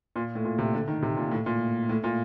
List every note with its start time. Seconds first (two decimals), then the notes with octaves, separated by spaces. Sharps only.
0.16 A#2
0.35 A2
0.45 A#2
0.59 C3
0.74 D3
0.88 D#3
1.02 C3
1.17 A#2
1.31 A2
1.46 A#2
1.89 A2
2.04 A#2